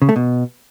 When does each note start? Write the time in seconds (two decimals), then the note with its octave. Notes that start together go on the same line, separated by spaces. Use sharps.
0.02 C#3
0.09 A3
0.16 B2